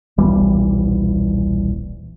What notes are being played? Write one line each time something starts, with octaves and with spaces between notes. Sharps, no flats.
D#1 B1 E3 G3